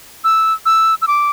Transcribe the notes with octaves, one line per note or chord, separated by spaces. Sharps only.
E6
E6
E6
D6